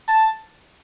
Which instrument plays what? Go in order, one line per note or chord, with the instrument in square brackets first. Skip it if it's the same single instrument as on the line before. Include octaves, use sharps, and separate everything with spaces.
[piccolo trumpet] A5